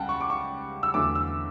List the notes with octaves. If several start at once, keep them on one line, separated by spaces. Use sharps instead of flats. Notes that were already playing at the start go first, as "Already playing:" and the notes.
Already playing: C#2 C#3 G3 F#5 G5 A5
C#6
D6
C#6
E6
E2 D3 F#3 A3 D6
E6